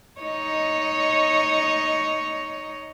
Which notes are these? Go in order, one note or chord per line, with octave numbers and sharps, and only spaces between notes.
D#4 C#5 D#5